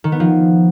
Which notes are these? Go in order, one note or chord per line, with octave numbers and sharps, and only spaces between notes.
D#3
B3
F3